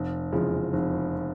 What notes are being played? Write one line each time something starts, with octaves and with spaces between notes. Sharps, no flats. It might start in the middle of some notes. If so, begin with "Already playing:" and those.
Already playing: F1
E2 C#3 F3 G#3
F1